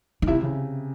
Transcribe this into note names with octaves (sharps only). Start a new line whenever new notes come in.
D#4
C3 E4
C#3